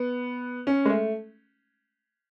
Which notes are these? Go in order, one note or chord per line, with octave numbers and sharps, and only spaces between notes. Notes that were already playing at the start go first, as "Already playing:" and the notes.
Already playing: B3
C#4
G#3
A3